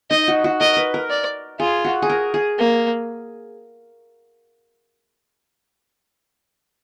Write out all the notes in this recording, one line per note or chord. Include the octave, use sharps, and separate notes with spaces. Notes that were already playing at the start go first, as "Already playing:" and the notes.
D#4 D#5
F#4
F#4
A#4 D#5
B4
A#4
D5
F4 G#4
F#4
G#4
A#4
G#4
A#3